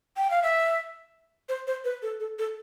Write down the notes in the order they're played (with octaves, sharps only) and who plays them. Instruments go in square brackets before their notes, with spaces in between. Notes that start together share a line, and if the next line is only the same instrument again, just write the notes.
[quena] G5
F5
E5
C5
C5
B4
A4
A4
A4